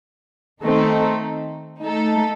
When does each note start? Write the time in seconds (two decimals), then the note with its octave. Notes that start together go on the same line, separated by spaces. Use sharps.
0.64 D#3 A3 C4 D#4 A4
1.81 A3 D#4 A4